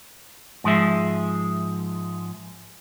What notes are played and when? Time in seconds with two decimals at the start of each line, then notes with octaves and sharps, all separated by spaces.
0.64 G#2 F3 G#3 E5